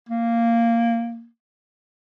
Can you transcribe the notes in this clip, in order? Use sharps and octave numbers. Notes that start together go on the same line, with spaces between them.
A#3